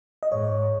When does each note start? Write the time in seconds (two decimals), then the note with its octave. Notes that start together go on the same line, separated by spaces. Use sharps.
0.23 D#5
0.32 G#2 C#5